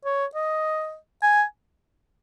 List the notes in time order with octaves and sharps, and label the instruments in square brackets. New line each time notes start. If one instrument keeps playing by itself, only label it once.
[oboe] C#5
D#5
G#5